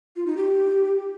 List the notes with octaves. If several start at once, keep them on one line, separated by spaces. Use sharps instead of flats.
F4
D#4
G4